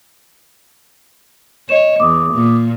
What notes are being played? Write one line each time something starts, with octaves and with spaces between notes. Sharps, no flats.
C#5 D#5 E7
E2 D6 D#6
A#2